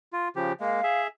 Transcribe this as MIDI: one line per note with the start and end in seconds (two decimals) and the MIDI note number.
0.13 0.28 65
0.36 0.52 49
0.36 0.52 53
0.36 0.52 67
0.60 0.81 56
0.60 0.81 58
0.60 1.00 77
0.84 1.07 68
0.84 1.07 76